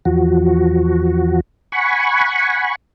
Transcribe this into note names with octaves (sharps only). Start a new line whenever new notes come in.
E2 F3 F#4
F#5 G#5 B5 C#6